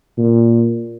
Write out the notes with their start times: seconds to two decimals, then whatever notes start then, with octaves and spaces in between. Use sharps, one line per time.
0.18 A#2